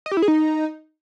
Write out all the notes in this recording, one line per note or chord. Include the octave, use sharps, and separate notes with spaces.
D#5
G4
E4
G#4
D#4